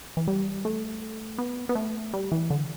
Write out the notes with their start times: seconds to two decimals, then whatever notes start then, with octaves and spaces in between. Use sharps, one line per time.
0.17 E3
0.28 G3
0.65 A3
1.38 B3
1.69 B3
1.75 A3
2.14 G3
2.32 E3
2.50 D3